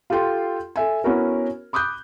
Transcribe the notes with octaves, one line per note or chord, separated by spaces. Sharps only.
F4 G4 A4 G5 C6
A4 E5 G#5
B3 C#4 E4 F#4 A#4
B5 D6 D#6 F#6 G6